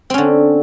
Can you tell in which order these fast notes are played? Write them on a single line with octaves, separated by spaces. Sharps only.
C4 C#4 D3